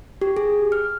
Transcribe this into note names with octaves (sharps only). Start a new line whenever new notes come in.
G4
G#4
F6